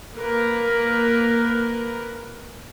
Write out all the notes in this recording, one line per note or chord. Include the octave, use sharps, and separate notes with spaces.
A#3 A#4 B4